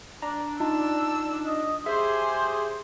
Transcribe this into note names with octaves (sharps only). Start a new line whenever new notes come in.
D4 A#5
D#4 F4 A5 E6
D#5
G4 G#4 C5 E5